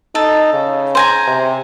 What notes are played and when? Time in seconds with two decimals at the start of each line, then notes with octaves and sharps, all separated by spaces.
0.15 D#4 A4
0.53 C#3
0.95 C5 G#5 A#5
1.28 C3